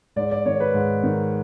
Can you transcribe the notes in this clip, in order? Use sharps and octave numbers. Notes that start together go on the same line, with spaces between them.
G#2 D5
D5
D#3 C#5
B4
G#2
D#3